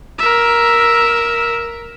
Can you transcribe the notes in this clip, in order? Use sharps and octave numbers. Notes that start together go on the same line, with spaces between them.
A#4 E5